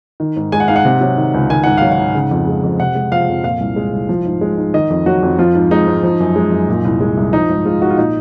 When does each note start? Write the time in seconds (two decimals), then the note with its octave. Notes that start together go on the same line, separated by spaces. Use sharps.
0.20 D#3
0.36 G#2
0.52 G#3 G#5
0.60 F#5
0.68 G#2 F5
0.76 F#5
0.85 C3
1.01 F#3
1.17 D#3
1.34 C#2
1.50 D#3 G#5
1.64 G#2 F#5
1.77 F#3 F5
1.92 F#5
1.99 G#2
2.15 C#3
2.31 F2
2.47 G#3
2.63 F2
2.80 C3 F#5
2.95 G#3
3.12 F3 F5
3.28 F2
3.44 A#2 F5
3.60 C2
3.76 G#3
3.93 C2
4.09 F3
4.25 G#2
4.41 G#3
4.58 G#2
4.74 D#3 D#5
4.90 F2
5.06 F#3 F#4
5.23 F2
5.38 F3 F4
5.55 G#2
5.71 G#3 D#4
5.87 G#2
6.03 F3
6.20 F#2
6.36 G#3
6.52 F#2
6.69 A#2
6.85 C2
7.01 G#3
7.17 C2
7.33 F3 D#4
7.49 G#2
7.65 G#3 F4
7.82 G#2 F#4
7.90 F4
7.98 A#2 D#4